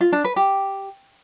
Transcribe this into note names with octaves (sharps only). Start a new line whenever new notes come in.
F4
D4
B4
G4